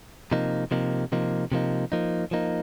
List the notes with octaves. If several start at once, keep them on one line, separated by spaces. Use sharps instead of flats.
C3 F3 A#3 D#4
C3 F3 A#3 D#4
C3 F3 A#3 D#4
C3 F3 A#3 D#4
F3 A#3 D#4
F3 A#3 D#4